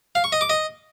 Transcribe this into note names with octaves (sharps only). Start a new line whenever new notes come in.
F5
C#6
D#5
D6
D#5